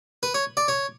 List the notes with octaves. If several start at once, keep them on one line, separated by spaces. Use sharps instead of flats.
B4
C#5
D5
C#5